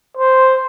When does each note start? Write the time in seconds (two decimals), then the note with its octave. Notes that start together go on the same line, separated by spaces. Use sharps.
0.17 C5